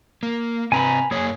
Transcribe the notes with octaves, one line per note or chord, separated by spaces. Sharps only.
A#3
C3 C4 B4 G#5 A#5 B5
F#2 A#3 G#4 C#5